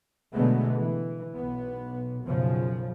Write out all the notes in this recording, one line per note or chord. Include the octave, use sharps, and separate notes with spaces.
B2 D3 F#3 G#3 A3 B3
E3
B1 B3
B1 F#2 C#3 F3